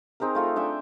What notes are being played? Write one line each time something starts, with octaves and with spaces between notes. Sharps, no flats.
C4 D#4 G#4 A#4
A3 F4 A4
D4 E5 G5 G#5